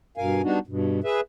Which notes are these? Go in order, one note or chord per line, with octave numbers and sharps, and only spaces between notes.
G2 B2 A#4 F5 G#5
G3 B3 D4 D#4 F#4
G2 B2
G#4 B4 E5